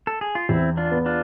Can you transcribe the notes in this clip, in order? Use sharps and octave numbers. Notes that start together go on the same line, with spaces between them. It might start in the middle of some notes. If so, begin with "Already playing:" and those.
A4
G#4
F4
E2 C4 E4
D4 F4
B3
D4 F4